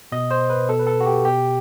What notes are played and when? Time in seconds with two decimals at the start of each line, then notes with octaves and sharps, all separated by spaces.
0.12 B2 D#5
0.31 C5
0.50 B4
0.69 B2 A4
0.79 B4
0.87 A4
1.00 F#4
1.06 G4
1.25 B2 G4